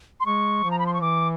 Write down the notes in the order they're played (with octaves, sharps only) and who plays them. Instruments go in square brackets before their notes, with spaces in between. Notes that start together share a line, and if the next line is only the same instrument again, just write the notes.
[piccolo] C6
[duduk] G#3 [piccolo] C#6
[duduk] F3
[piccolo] A#5
B5
C6
C#6
[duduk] E3 [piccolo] D6